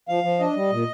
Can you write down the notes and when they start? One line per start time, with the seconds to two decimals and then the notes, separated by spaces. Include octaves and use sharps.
0.08 F3 F5
0.24 F3
0.39 D4 D#5
0.56 G3
0.72 A#2